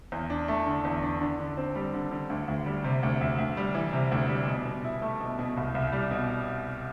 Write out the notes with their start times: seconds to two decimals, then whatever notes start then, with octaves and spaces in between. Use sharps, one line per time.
0.12 E2
0.30 D4
0.48 A3
0.66 D3
0.85 E2
1.03 D4
1.21 D3
1.39 D3
1.57 C4
1.75 G3
1.94 D3
2.12 D3
2.30 D2
2.48 D2
2.66 G3
2.84 C3
3.03 D2
3.21 D2
3.38 D2
3.57 G3
3.75 E3
3.93 C3
4.11 D2
4.29 G3
4.48 B2
4.65 B2
4.84 E4
5.02 A3
5.20 B2
5.39 B2
5.57 C2
5.75 C2
5.93 G3
6.11 B2